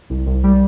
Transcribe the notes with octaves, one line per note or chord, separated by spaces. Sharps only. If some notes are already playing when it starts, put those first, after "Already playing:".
C2
C2
G3